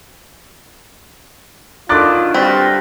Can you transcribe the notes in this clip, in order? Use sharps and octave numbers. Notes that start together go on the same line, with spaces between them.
D3 D#3 F#3 F4 D6 F#6 A6
G3 C4 F4 F#4 B4